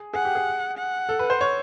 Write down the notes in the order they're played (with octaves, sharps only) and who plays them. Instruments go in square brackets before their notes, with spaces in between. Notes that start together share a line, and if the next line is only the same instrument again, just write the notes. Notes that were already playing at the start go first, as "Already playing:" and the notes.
Already playing: [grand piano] G#4
[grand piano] G#4 [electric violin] F#5
[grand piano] G4
G#4
[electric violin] F#5
[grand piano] A4
B4
C5
C#5